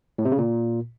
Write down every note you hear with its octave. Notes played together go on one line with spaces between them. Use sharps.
A2
C3
C#3
A#2